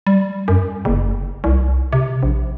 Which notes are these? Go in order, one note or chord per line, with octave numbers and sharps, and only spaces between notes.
G3
F#2
F#1
C2
C3
A#1